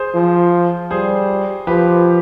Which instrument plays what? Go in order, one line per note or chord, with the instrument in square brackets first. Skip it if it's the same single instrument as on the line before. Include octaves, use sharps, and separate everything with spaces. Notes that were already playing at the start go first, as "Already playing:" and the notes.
Already playing: [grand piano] G#4 C5
[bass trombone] F3
[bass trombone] G3 [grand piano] G#4 C5
[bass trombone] F3 [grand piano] G4 B4